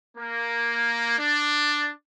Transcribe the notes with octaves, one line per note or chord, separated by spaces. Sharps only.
A#3
D4